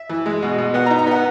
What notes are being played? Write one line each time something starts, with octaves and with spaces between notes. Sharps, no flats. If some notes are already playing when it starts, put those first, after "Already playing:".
Already playing: E5
E3
G#3
B2
B2
B3 F#5
A#5
D#4
A#5
B3 F#5